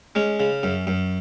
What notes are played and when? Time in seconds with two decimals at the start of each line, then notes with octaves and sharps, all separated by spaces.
0.15 G#3 C#4
0.40 C#3
0.63 F#2
0.87 F#2